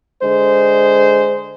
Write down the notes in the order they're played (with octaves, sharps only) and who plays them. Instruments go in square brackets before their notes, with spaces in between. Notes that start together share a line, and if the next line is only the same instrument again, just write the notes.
[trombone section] D3 G#3 C5